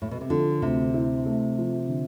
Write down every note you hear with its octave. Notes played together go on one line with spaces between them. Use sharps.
A2
B2
C3
D3 F3
D2 C3
E4
A3
F3
D3